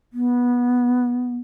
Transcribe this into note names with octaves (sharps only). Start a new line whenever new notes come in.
B3